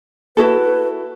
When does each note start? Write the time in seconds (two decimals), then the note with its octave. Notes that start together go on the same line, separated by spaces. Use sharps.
0.37 E4 F#4 A4 B4